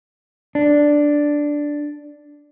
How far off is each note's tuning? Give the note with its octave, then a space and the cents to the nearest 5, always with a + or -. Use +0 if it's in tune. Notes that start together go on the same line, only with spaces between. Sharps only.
D4 +0